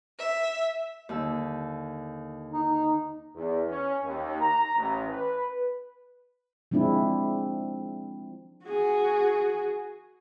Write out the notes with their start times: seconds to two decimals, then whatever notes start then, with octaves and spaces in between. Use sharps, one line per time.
0.19 E5
1.09 D#2 D3 E6
2.53 D#4
3.35 E2
3.67 C#4
4.03 D#2
4.40 A#5
4.76 A1
5.09 B4
6.71 F3 G#3 C4 D4 E4
8.66 F#4 G#4